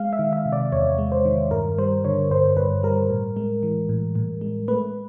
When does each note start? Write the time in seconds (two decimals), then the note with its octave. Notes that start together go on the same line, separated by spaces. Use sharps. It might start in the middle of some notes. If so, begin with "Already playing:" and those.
Already playing: G#3 F5
0.13 E5
0.19 D#3
0.33 E5
0.46 C3
0.52 D5
0.72 E2 C#5
0.98 G#3
1.12 C5
1.25 D#3
1.51 G2 A#4
1.78 G3 C5
2.05 D3 C#5
2.31 G2 C5
2.57 G2 B4
2.83 G3 A#4
3.10 A2
3.37 G#3
3.63 E3
3.89 A2
4.15 A2
4.41 G#3
4.68 A3 B4